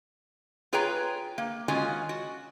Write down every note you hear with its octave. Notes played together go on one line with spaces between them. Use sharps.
F4 G#4 B4 C#5 G5 A#5
A#3
D#3 G#3 C#4 F4 F#4 G#5
F#4